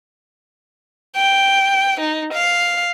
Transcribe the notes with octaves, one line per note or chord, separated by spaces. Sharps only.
G5
D#4
F5